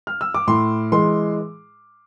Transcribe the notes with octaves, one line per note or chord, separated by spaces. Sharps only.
F6
E6
D6
A2 C6
E3 G#3 C6